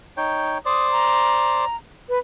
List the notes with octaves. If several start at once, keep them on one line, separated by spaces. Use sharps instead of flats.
D#4 C#5 G5
C5 D5 D#6
A#5
B4